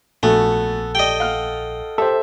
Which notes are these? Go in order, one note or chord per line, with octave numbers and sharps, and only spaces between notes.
A#1 A3 B3 F#4 A4 G#5
G4 D5 D#5 G5
F5 F#5 F6
G4 A4 C5 E5